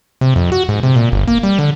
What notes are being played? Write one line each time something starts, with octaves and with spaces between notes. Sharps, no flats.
C3
F2
F#4
G#2
C3
A#2
G1
A#3
G3
D3